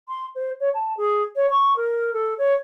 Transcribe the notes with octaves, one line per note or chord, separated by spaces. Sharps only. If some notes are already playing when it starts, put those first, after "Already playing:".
C6
C5
C#5
A5
G#4
C#5
C#6
A#4
A4
C#5